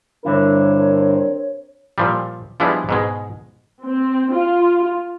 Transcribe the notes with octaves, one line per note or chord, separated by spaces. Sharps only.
G2 D3 C4 D4 E4 A#4 C#5
A#2 F3 G3
F3 G3 G#3 B3 D4 E4
G#2 B2 G#3
C4
F4